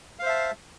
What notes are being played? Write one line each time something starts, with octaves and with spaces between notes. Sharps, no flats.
C5 E5 F5 A5